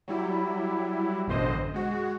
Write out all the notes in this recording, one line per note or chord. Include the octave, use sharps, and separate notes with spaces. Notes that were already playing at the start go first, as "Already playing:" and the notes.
F#3 G3 E4
A1 F#2 B2 D3 C5 D#5
G#3 F#4